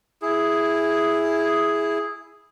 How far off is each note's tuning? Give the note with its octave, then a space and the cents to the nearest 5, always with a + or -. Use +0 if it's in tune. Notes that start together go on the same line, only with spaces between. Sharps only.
E4 +0 G#4 +0